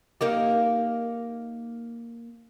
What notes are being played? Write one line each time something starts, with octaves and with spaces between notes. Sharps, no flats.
A#3 D#4 G4